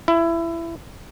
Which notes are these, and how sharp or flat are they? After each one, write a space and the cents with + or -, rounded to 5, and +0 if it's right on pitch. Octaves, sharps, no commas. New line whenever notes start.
E4 +20